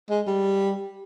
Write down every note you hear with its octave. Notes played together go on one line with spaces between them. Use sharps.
G#3
G3